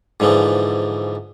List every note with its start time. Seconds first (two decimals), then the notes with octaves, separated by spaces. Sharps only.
0.20 G#2 D3 E3 F3